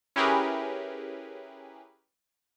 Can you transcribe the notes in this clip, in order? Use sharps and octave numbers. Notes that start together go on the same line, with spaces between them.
C#4 E4 G4 G#4 A#4 B4